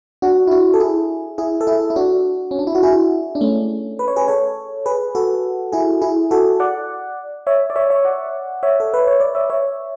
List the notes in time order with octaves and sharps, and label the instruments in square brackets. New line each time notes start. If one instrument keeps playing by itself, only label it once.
[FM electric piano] D4 F#4
E4
D4 F#4
A4
E4 G#4
E4 G#4
A4
E4 G#4
E4
D4 F#4
C#4
D4
E4
F#4
E4 G#4
D4
A3 C#4
B4
C#5
G#4 B4
A4 C#5
G#4 B4
F#4 A4
E4 G#4
E4 G#4
F#4 A4
D5 F#5
C#5 E5
D5
C#5 E5
C#5 E5
D5 F#5
C#5 E5
A4
B4
C#5
B4 D5
C#5 E5
C#5 E5